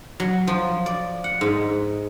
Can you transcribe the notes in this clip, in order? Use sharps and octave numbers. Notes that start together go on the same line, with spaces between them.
F#3
F3
D5
F#5
G#2